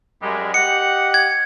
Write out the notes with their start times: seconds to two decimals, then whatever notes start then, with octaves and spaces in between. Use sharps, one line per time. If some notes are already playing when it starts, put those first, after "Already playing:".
0.23 F#2 G3 G#3
0.54 G4 D#5 F#5 C#7
1.14 G#6